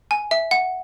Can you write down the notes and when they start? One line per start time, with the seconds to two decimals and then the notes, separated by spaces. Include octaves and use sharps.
0.11 G#5
0.31 E5
0.51 F#5